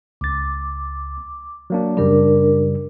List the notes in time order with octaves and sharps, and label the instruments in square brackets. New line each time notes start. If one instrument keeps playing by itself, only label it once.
[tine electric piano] C#2 A6 [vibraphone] D6
[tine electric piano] F#3 A#3 D4
[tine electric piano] F#2 C#3 G3 [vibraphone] D4 A#4